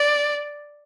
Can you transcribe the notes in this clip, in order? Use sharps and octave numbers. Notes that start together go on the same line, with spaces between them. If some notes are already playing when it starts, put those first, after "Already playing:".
Already playing: D5